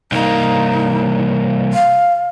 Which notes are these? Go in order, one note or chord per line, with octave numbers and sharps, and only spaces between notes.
C2 A#3 D#4
F5